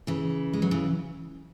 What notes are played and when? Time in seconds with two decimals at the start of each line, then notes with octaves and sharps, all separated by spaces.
0.07 C#3 E3
0.53 G#3
0.62 F#3
0.71 C#3 E3